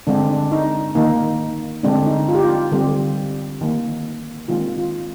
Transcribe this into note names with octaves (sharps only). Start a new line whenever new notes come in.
D3 G#3 C4 D4
D4
D#4
D#3 A#3 D#4
D3 G#3 C4 D4
D#4
F4
G4
F4
G4
D3 G3 C4 G4
D#3 A#3
D#3 G#3 C4 F4
F4